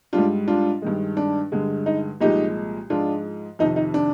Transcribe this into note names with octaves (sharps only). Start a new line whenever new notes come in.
G#2 G3 D4 F4
D4 F4
G2 D#3 G#3
D4
G2 D3 G#3
D#4
C2 A#2 F3 G#3 D#4 G4
G#2 F3 G#3 D4 F4
F2 C3 D#3 D#4
D#4
D4